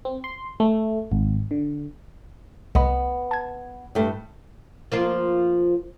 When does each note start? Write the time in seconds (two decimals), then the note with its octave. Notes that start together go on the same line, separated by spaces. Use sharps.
0.05 C4
0.24 C6
0.60 A3
1.12 G#1
1.51 D3
2.75 C2 B3 D#5 B5
3.31 A5 G#6
3.95 G2 A3
4.92 F3 A#3 F4